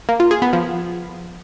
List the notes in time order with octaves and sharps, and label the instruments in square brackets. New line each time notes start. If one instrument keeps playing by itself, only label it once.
[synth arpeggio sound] A#3
F4
G#4
B3
F3